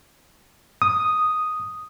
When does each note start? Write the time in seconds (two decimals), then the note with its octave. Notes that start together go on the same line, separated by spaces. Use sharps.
0.82 D#6